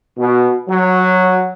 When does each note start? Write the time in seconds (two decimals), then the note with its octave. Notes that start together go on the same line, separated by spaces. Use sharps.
0.18 B2
0.68 F#3